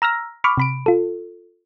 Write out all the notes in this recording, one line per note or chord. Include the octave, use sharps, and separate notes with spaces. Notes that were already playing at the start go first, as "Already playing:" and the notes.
A#5 E6 F6 A#6
B5 C#6 D6 F6
C3 B5 D7
F4 A4